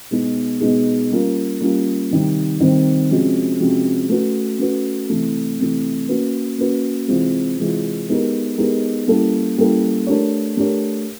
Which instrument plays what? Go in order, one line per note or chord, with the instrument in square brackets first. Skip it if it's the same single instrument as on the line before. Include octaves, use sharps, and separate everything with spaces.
[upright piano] B2 G#3 B3 D#4 G#4
B2 G#3 B3 D#4 G#4
G3 A#3 C#4 F4 A#4
G3 A#3 C#4 F4 A#4
C3 D#3 G3 C4
C3 D#3 G3 C4
C3 F3 G#3 C#4 F#4
C3 F3 G#3 C#4 F#4
A3 C#4 F#4 B4
A3 C#4 F#4 B4
C3 E3 A3
C3 E3 A3
A#3 C#4 F#4 B4
A#3 C#4 F#4 B4
C3 E3 G#3 C4 F4
C3 E3 G#3 C4 F4
G#3 B3 D#4 G4 A#4
G#3 B3 D#4 G4 A#4
G3 A#3 C#4 E4 A4
G3 A#3 C#4 E4 A4
A3 D4 G4 A#4 C#5
A3 D4 G4 A#4 C#5